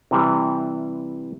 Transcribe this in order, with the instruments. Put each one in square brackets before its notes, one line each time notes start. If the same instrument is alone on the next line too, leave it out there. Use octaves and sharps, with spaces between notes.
[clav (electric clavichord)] C3 E3 G3